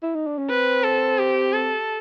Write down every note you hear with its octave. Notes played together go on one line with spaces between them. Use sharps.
E4
D#4
D4
C#4
C4 B4
A4
G4
A4